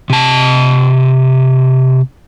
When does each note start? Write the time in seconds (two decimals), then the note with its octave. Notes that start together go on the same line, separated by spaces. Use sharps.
0.10 C3 A5